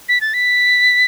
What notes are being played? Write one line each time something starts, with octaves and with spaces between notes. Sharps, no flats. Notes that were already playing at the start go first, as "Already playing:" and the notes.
B6
A6
B6